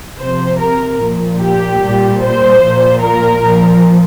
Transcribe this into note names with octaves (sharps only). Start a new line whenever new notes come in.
C3 F3 C5
A#4
A#2 F3
G4
A#2 G3
C5
A#2 F3
A#4
A#2 F3